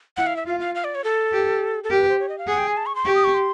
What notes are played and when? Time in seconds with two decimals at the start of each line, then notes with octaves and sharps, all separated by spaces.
0.17 E4 F#5
0.27 F5
0.37 E5
0.46 F4 F5
0.60 F5
0.75 F5
0.84 D5
0.95 C#5
1.04 A4
1.33 G4
1.84 A4
1.90 G4 A#4
2.00 B4
2.09 C5
2.20 C#5
2.29 D#5
2.38 F5
2.47 G#4 F#5
2.58 G5
2.67 G#5
2.77 A5
2.86 C#6
2.95 C6
3.05 G4 C#6
3.15 D#6
3.24 C#6
3.34 C6